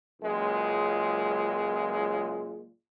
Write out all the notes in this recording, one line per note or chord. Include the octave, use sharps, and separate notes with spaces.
C#2 F#2 A#2 G#3